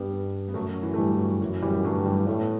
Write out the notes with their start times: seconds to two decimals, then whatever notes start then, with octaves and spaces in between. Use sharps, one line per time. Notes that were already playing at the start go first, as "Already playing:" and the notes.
Already playing: G2 G3 B3
0.48 B3
0.54 F#2 F#3 A3
0.69 F#3
0.83 E3
0.94 A3
0.97 G2 E3 G3
1.15 E3
1.19 F#3
1.40 F#2 E3
1.62 E3 G3
1.84 G2 F#3 A3
2.05 E3 G3
2.28 A2 A3
2.41 B3